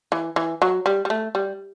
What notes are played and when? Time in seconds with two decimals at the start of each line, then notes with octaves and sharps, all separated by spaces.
0.12 E3
0.36 E3
0.62 F#3
0.86 G3
1.05 G3
1.10 A3
1.35 G3